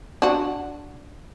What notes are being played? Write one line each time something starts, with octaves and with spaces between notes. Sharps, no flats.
D4 F#4